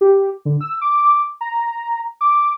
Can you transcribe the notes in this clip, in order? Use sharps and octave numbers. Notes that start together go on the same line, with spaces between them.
G4
D3
E6
D6
A#5
D6